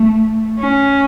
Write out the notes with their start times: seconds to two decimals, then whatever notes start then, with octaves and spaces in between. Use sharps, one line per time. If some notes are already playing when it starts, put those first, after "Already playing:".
Already playing: A3
0.59 C#4